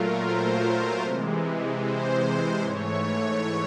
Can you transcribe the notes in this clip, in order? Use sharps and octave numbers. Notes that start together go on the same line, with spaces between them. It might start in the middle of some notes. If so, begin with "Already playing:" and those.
Already playing: A#2 F#3 A3 F4 A#4
C5
C3 E3 G#3
C5
G#2 E3 A3 C#5
C#5